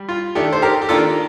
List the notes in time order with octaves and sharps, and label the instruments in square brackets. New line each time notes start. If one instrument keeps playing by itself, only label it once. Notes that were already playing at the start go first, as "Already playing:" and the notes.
Already playing: [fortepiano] G3
F4
D#3 A3 D4 G4
C5
G4 A#4
G4
D#3 A#3 D4 F4 A4